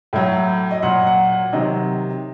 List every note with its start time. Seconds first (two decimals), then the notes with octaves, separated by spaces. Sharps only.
0.13 A2 F#3
0.71 D#5
0.82 A#2 F#3 F#5
1.07 F#5
1.29 F#5
1.53 C3 D#3 F#3 D#5